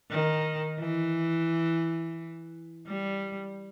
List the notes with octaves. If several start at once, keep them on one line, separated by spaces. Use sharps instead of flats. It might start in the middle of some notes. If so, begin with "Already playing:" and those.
D#3
E3
G3